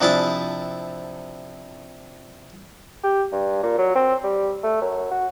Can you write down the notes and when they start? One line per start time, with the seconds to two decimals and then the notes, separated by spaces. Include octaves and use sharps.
0.01 C3 F3 D4 E4 G#4 A5
3.04 G4
3.32 G2
3.63 A#2
3.78 F#3
3.95 C4
4.24 G3
4.64 A3
4.81 F#2
5.11 F#4